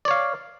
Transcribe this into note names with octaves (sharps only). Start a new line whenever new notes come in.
C#5 D5 F5